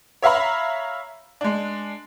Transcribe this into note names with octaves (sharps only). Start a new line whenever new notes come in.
C#5 E5 F5 A#5 B5
G#3 D4